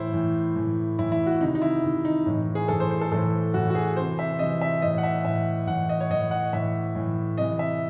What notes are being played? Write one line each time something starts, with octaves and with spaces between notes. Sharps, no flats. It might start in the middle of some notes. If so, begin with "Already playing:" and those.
Already playing: A2 E3 E4 C5
A2 E3
A2 E3
A2 E3 E4
E4
F#4
C3 D#3 D#4
D#4
E4
C3 D#3
D#4
A2 E3
G#4
A2 E3 A4
C5
C5
A4
A2 E3 A4
A2 E3 F#4
F#4
G#4
C3 E3 C5
E5
C3 E3 D#5
E5
A2 E3 D#5
F#5
E5
A2 E3 E5
A2 E3 F#5
D#5
C#5
A2 E3 D#5
F#5
A2 E3 E5
A2 E3
C3 E3 D#5
E5